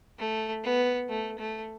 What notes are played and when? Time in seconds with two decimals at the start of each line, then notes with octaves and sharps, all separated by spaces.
0.18 A3
0.64 B3
1.09 A3
1.39 A3